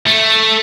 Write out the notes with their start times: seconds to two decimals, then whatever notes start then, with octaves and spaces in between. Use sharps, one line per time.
0.07 A3